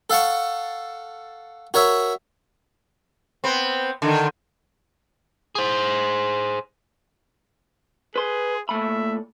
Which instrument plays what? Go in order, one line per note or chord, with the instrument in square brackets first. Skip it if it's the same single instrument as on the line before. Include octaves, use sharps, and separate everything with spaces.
[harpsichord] A4 F5 F#5 A5 C#6
F#4 A#4 C#5 E5
[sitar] B3 C4
D3 D#3
[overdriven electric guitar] G#4 C5
[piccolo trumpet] G#4 [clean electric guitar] B4 C6
[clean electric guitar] A#2 A3 B5 [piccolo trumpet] E5